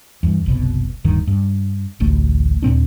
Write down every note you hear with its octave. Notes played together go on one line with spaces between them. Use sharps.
E2 G2
F#1 C2 B2
D1 G2 D#3
G2
D1 A1 D2 A3
D#2 A#2 C4 D4